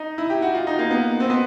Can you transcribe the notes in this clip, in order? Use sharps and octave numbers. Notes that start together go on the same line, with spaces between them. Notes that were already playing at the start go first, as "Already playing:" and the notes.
Already playing: D#4
E4
G4
F#4
F4
D#4
A#3
B3
C4
B3